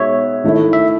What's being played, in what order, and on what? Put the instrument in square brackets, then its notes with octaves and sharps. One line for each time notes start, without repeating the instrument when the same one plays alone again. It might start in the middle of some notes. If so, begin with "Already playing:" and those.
Already playing: [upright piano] B2 G#3 B3 D#4 [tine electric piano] C#5 E5
[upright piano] D#3 A3 E4
[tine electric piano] E5